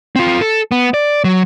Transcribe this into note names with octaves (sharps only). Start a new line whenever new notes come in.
C4 F4
A4
B3
D5
F#3